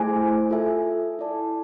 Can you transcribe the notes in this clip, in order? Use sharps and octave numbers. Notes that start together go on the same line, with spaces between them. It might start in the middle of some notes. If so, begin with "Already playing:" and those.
Already playing: A3 E4 G#4 C5 G#5
F4 A4 E5 G#5
E4 A4 D5 A5